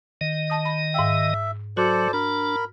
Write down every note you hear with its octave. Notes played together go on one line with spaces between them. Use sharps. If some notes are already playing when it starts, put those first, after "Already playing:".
D#3 D#5
A5 D#6
B5
G#2 E5 F5 G5
F#3 F#4 A4 C5 D5
D4 A#4 B5